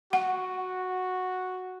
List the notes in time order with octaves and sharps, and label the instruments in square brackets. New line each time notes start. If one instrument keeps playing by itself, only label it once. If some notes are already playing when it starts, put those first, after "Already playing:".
[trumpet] F#4 [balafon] F#5